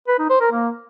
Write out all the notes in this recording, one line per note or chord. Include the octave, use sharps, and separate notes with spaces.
B4
D#4
C5
A#4
A#3